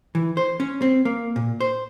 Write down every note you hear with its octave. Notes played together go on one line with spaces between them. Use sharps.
E3
C5
C#4
C4
A#3
A#2
C5